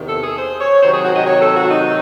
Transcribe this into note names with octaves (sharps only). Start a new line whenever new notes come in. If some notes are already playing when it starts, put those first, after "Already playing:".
Already playing: E2 C3 D#3
A4
G#4
C5
C#5
C3 D#3 F#3 C4 C5
G#4
F#4
D#5
C#5
A4
F#4
D#4